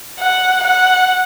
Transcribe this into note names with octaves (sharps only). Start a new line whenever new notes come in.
F#5
F#5